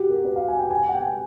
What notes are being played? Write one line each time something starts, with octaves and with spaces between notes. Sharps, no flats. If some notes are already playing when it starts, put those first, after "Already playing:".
Already playing: F#4 G4
A#4
B4
F5
G#5
G5
G#5
F#5
G5